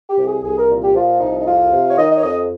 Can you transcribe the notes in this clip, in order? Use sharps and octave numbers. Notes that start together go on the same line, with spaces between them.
G4
C2
G#4
C2 G#4
A#4
A#2
G4
F3 F4
C2 D#4
D#4
F2 F4
C3
C#5
D#3 D#5
D#5
C#5
F2 D#5